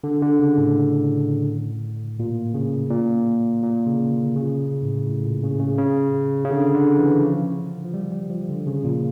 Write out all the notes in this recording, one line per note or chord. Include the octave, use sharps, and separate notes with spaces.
D3
D3
C#3
A2
A#2
C#3
A#2
A#2
C#3
D3
C#3
A2
A2
A#2
C#3
C#3
C#3
C#3
D3
D3
E3
F3
F3
G3
G3
F3
D3
C#3
A#2